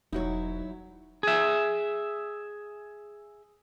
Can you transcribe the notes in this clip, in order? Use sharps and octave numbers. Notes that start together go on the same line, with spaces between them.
E1 F#3 D#4 E4 F#4 C#5
G#4 E5